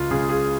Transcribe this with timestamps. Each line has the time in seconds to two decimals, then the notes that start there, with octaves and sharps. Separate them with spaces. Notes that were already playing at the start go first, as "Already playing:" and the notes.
Already playing: C#2 F4
0.11 C#3 G#4
0.15 G#3
0.29 G#4